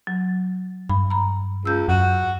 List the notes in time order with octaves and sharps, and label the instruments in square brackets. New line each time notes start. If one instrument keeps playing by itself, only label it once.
[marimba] F#3
[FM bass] G2 [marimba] B5
[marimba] A#5 B5
[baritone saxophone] C#2 [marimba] E6 G6
[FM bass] F#2 [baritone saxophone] F#4